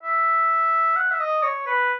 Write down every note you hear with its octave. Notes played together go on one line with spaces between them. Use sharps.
E5
F#5
E5
D#5
C#5
B4